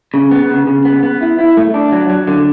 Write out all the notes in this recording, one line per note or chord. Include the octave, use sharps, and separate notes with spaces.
C#3
B3
C#3
C#3
B3
B3
E4
E4
A3
D4
F#3
F#3
D3